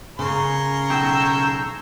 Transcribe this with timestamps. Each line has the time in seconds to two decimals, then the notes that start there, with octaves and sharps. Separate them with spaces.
0.19 C#3 A#4 C#5 C6
0.90 B1 G5 E6 G6